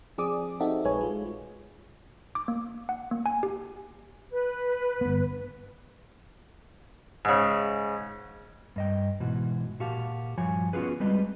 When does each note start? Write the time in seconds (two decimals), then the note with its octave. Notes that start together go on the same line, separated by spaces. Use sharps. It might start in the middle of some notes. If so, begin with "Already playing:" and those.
0.18 F3 C4 G#4 D5 D6 D#6
0.60 C4 D#4 F#4 G4 A4 E5
0.85 A#1 G#3 G#4 B4 C#5 G#5
1.01 G#3 F4
2.35 D6
2.48 A#3
2.89 F#5
3.11 A#3
3.26 G#5
3.43 G4
4.30 B4
5.01 G1 B3
7.25 G#2 C#3
8.76 G2 D#5 G5
9.20 G#2 B2 E3 F#4
9.80 A#2 F#4 G4 F5 A5
10.37 G2 F3 C#5 G#5
10.73 B3 C#4 F4 F#4 G#4 B4
11.00 G3 G#3 C4 B4 D#5